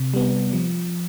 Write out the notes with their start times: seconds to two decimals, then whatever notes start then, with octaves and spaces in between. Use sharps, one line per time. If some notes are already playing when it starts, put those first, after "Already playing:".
Already playing: C3
0.14 G3 B3
0.53 F3